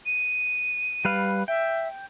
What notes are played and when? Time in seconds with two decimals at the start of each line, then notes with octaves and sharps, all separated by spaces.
0.06 D#7
1.05 G3 B4 F5
1.48 E5 G5